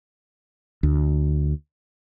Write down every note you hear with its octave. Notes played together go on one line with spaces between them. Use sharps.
D2